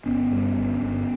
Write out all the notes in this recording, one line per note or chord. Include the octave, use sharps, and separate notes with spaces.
G1 B3 C#4
G2
G1
G1